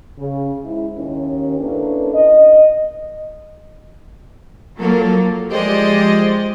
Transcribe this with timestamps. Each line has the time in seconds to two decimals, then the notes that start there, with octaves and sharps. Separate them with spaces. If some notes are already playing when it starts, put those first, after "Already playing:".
0.18 C#3
0.64 G#2 E4
0.96 D#2 D#3 C#4
1.59 A#3 C#4 D4 E4 A4 B4
2.14 D#5
4.78 F3 F#3 A#3 A4 A#4
5.50 F3 G#3 G4 C5 D5 D#5